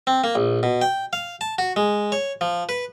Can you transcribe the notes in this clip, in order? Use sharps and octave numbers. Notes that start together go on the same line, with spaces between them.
C4
A#3
A#1
B2
G5
F5
A5
F#4
G#3
C#5
F3
B4